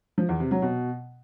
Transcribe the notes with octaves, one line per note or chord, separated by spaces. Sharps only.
F3
E2
C3
F#3
B2